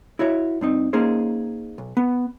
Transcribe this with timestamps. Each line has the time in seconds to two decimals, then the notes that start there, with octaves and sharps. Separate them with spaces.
0.19 E4 F#4 C#5 E5
0.61 G2 C4 D#4
0.93 A#3 C#4 D#4 G#4 C5
1.78 B1
1.97 B3